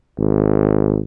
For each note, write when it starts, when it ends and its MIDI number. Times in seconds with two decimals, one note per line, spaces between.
0.18 1.00 32